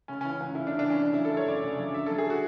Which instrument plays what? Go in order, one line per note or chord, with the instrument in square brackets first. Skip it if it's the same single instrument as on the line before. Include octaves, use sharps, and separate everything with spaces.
[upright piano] C#3 C#4
C#4
E3
C#4
C#2
C#2 E4
D4
C#3
D4
E3 C#4
C#3 D4
F#3 E4
A4
F#2 C#5
F#2 D5
C#3
F#3
D3 E5
F#3 A4
G#4
F#4